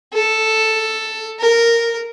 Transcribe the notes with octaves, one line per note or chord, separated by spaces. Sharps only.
A4
A#4